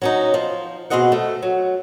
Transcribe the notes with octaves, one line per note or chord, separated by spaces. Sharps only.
F#3 C#4 D#4
F3
B2 F3 C4 G#4 D#5 F#5
A3
F#3